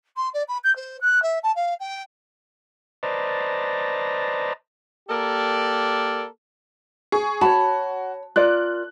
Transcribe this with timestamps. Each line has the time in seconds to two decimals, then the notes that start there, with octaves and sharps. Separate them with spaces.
0.16 C6
0.33 D5
0.48 B5
0.64 G6
0.76 C5
1.01 F#6
1.22 E5
1.43 A5
1.55 F5
1.79 G5
3.03 B4 C5 D5 D#5 A5 A#5
5.09 A#3 G4 A4 A#4 D5
7.12 G#4 C#6
7.41 F#4 C#5 A5 B5
8.36 F4 A#4 D5 F#6